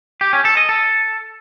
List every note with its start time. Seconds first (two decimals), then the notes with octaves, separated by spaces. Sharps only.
0.21 G4
0.33 C#4
0.45 A4
0.57 D#5
0.69 A4